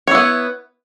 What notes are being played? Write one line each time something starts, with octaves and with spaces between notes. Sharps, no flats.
B3 E4 C#5